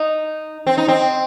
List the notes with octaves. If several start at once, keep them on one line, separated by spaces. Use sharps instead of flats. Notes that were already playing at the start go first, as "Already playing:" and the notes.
Already playing: D#4
C4
D#4
C4